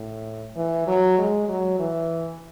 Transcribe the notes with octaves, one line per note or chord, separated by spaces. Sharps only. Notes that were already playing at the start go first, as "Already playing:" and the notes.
Already playing: A2
E3
F#3
G#3
F#3
E3